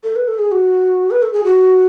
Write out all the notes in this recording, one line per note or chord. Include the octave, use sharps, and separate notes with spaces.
A4
B4
A4
G#4
F#4
B4
A4
G#4
F#4